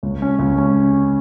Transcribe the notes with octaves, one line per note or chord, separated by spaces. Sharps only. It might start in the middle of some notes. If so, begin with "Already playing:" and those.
C#2
C#4
C#2
C#4